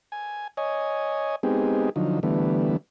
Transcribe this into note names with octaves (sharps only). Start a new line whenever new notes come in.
G#5
C#5 D#5 G#5
G#3 B3 C4 D#4 G4 G#4
D3 F3 F#3 D#4
D3 E3 G3 A3 B3